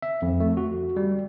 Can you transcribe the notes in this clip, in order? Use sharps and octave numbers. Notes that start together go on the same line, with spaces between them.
E5
F2
A3
F#4
G3